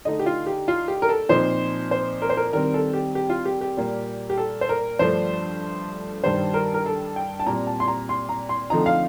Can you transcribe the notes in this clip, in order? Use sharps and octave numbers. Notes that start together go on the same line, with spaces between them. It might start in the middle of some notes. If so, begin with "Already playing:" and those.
D3 A3 D#4 D#5
G4
F4
G4
F4
G4
A#4
A4
A#2 F3 C4 D#4 C5
C5
A#4
C5
A#4
D#3 G3 C4 A#4
A4
G4
G4
F4
G4
G4
A#2 G3 A#3
G4
A4
C5
A#4
G2 F3 A3 D4 C5
G2 D#3 G3 C5
A#4
A#4
A4
G5
A5
A#2 G3 C4 A#5
A5
C6
A#5
C6
A#5
C6
D3 F3 A3 C4 D#4 A#5
F5